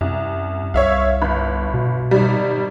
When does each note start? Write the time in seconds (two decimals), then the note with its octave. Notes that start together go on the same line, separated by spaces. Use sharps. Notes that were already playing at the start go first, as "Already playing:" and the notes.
0.01 C2 F#2
0.74 C2 C#5 E5 F5
1.22 G1 B5
1.74 B2
2.11 G#1 G3